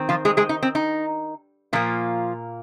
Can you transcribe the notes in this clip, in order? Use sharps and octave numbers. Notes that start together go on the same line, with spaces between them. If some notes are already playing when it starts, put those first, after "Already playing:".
Already playing: D#3 C4
F3 F4
G#3 G#4
G#3 G#4
D#4
C4
D#4
A#2 F3 A#3 F4